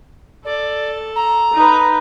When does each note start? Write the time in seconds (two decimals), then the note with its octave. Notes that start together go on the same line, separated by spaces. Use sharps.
0.45 A4 D5
1.16 A#5
1.53 D#4 B4